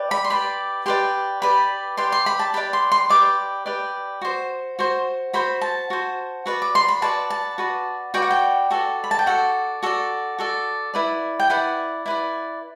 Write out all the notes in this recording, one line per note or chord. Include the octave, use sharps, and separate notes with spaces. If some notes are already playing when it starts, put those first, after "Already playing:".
Already playing: G4 B4 D5
B5
C6
G4 B4 D5 B5
G4 B4 D5 C6
G4 B4 D5 B5
G4 B4 D5 C6
C6
B5
A5
G4 B4 D5 B5
C6
C6
G4 B4 D5 D6
G4 B4 D5
F#4 C5
F#4 C5
F#4 C5 B5
A5
F#4 C5
F#4 B4 D5
D6
C6
B5
F#4 B4 D5 A5
A5
F#4 B4 D5
F#4 B4 D5 G5
F#5
G5
F#4 A4 D5
B5
A5
G5
F#4 A4 D5 F#5
F#4 A4 D5
F#4 A4 D5
E4 B4 D5
G5
E4 B4 D5 F#5
E4 B4 D5